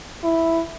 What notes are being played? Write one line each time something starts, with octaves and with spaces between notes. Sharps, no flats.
E4